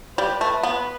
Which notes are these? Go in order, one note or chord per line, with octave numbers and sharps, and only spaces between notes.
G3 B4
A3
B3